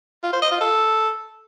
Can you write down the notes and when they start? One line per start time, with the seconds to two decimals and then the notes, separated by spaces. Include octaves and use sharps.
0.23 F4
0.33 C5
0.42 D#5
0.51 F4
0.61 A4